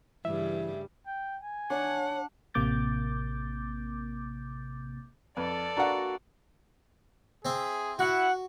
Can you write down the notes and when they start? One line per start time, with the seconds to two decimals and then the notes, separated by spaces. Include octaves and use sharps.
0.25 G2 C#3 E3 G3 E5
1.06 G5
1.41 G#5
1.70 D4 C#5 F#5
2.54 A1 C3 A#3 D6 G6 A6
5.37 F2 A4 B4 D5
5.77 A#3 D4 F#4 F#5 A#5
7.45 C4 G#4 E5
7.99 E4 F#4 F#5